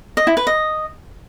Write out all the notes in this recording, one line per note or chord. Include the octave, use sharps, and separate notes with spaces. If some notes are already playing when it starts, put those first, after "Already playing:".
D#5
E4
B4
D#5